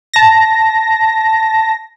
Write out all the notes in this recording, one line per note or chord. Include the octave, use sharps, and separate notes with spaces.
A5 A#6